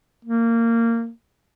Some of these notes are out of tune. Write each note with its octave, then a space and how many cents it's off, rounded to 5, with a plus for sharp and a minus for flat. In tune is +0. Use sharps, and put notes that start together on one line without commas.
A#3 -20